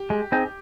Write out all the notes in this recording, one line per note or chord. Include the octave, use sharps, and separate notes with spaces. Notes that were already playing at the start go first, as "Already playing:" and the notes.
Already playing: G4
G#3
C4 D#4 G#4